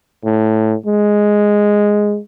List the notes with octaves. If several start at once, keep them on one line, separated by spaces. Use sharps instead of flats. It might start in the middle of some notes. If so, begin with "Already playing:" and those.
A2
G#3